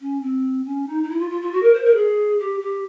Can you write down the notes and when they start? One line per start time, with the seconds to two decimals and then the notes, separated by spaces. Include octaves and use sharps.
0.01 C#4
0.22 C4
0.65 C#4
0.87 D#4
1.03 D#4
1.09 E4
1.19 F4
1.30 F4
1.41 F4
1.52 F#4
1.63 A#4
1.74 C5
1.85 A#4
1.95 G#4
2.39 G4
2.61 G4